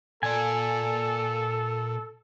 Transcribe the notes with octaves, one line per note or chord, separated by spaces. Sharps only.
A#2 A4 D5 G#5